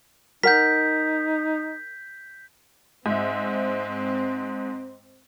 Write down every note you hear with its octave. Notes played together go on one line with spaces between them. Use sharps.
D#4 A#4 F#5 G6 B6
G#2 C4 E5